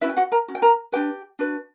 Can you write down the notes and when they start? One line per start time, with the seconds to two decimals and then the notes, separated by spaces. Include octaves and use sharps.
0.01 C#4 E4 F#4 B4 E5
0.10 G5
0.17 F#4 F#5
0.32 A#4 A#5
0.48 C#4 F#4
0.55 G5
0.62 A#4 A#5
0.92 D4 F#4 G4 B4 G5
1.39 D4 F#4 B4